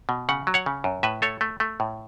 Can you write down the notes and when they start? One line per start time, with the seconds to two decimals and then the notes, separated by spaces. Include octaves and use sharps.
0.09 B2
0.29 C#3 F#5
0.47 F#3
0.54 C#5 F#5
0.66 C#3
0.84 F#2
1.03 A2 B4 E5
1.22 A3 A4 C#5
1.41 A3
1.60 A3
1.80 A2